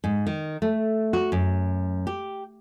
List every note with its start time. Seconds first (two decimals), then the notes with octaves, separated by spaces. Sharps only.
0.04 G#2
0.27 D#3
0.62 A3
1.13 F#4
1.32 F#2
2.07 G4